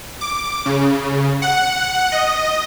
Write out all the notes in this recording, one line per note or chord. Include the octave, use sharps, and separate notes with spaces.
D6
C#3
F#5
D#5